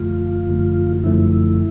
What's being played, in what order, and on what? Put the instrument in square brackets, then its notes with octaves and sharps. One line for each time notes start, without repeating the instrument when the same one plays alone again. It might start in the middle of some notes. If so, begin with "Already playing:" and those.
Already playing: [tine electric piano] G1 F#2 D3 F3 A3 [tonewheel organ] F4
[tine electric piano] G1 F#2 D3 F3 A3
[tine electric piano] G1 F#2 D3 F3 A3 [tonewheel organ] E4